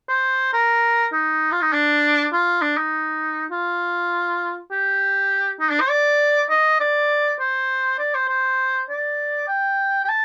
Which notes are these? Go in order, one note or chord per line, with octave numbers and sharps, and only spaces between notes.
C5
A#4
D#4
F4
D#4
D4
F4
D4
D#4
F4
G4
D#4
D4
C5
D5
D#5
D5
C5
D5
C5
C5
D5
G5
G5
A5